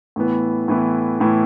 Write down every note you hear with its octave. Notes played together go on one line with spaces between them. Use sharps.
A2 E3 B3
A2 E3 B3
A2 E3 B3